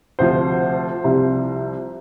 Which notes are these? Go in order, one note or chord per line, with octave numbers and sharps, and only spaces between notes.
D2 C3 F3 C5
C2 C3 F3